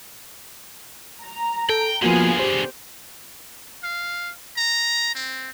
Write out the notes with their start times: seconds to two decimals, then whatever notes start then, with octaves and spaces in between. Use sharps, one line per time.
1.22 A#5
1.69 A4 G5
2.02 D3 F3 A#3 B3 F4 F#4 G#4 G#5
2.39 G4 C5
3.83 F5
4.57 A#5
5.15 C4